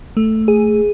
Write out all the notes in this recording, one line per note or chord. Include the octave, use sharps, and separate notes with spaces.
A3
G#4